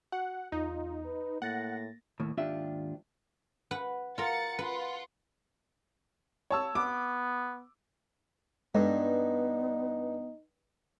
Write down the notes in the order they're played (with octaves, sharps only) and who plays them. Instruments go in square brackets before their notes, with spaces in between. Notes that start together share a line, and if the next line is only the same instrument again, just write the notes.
[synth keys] F#4 [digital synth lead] F#5
[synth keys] E2 [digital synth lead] D#4 [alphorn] F4
[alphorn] B4
[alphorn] A2 [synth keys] A#3 A6 A#6 [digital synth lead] F#5
[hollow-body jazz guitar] D#2 A2
D#2 G#2 D4 F4 G4 E5
[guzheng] B4 F#5
[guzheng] F4 A#4 [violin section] F#5 A6 C#7
[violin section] F4 F#5 C6 [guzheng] B4
[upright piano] C#5 A5 E6
[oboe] B3 [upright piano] D6
[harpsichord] G2 [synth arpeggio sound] G#3 A4 B4 [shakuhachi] B3 [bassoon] D#4